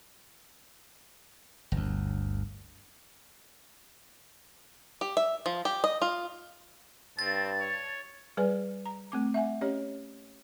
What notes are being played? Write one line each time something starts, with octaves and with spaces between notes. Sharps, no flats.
G1 D2
G4
E5
F3
G4
D#5
F4
G2 C4 A5 A6
C#5
G3 G#4 B4 D5 G#5
A#5
A3 C4 D6
E5 F#5 G#5
C#4 G4 C#5 D#5